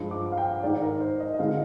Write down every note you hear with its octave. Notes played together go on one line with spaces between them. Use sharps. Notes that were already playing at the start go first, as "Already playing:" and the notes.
Already playing: G2 F3 G#3
D6
F5
G5
G#2 D#3 G#3 D5
A#4
C5
D#5
D#5
D3 G#3 F5